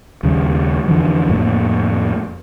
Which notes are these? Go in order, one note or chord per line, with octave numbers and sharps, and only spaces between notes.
D#2 C#3 G3
F2 D3 E3 F3
F2 A2 A3 A#3